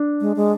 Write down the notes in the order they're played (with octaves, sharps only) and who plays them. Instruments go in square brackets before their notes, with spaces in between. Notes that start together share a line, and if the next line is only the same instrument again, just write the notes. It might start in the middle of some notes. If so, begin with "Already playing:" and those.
Already playing: [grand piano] D4
[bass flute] G#3
G#3